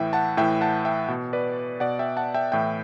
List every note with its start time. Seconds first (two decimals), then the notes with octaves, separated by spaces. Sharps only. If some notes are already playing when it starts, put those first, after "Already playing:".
Already playing: A2 E3 E5 G5
0.13 F#5 A5
0.37 A2 E3 E5 G5
0.61 F#5 A5
0.85 E5 G5
1.08 B2
1.33 B4 D5
1.80 B2 D5 F#5
1.99 E5 G5
2.17 F#5 A5
2.34 E5 G5
2.52 A2 E3 E5 G5